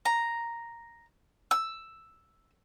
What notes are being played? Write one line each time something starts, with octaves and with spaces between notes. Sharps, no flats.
A#5
E6